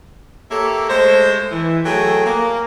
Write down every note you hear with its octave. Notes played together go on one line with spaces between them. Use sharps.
A#3 G4 A4 C#5 E5
G#3 A3 C5
E3
F#3 A3 G#4 A4 G5
A#3